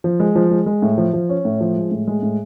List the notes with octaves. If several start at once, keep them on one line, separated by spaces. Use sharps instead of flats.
F3
G#3
F3
G#3
G#3
A2
F3
F3
C#4
A2
F3
G#3
A2
G#3
A2